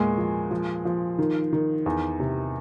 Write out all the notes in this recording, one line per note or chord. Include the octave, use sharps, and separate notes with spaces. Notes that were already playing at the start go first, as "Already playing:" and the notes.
Already playing: E2 A#2 G#3
F3
F3
F3
D#3
D#3
E2
C3